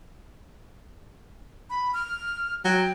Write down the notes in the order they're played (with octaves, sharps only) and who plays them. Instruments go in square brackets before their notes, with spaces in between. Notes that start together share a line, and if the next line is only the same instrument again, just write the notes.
[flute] B5
F6
[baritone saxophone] F#3 [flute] G5